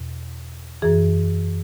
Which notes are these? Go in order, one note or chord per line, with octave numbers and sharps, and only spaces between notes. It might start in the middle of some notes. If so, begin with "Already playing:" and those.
Already playing: E2 B2
F#2 E3 G#4